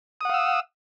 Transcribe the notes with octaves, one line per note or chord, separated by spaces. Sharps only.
F5 F#5 D#6 E6